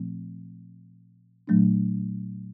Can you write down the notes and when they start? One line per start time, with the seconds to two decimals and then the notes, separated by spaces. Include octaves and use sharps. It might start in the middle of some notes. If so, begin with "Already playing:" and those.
Already playing: A#2 F3 A3 C4
1.48 A#2 F#3 A3 D4